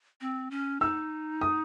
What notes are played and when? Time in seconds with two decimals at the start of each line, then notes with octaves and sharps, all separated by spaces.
0.21 C4
0.51 C#4
0.80 D#4 E6
1.41 D#6